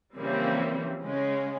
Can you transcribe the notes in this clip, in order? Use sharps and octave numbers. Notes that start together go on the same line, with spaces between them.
C#3 E3 F3 G3 A#3 C4
C#3 G#3 C#4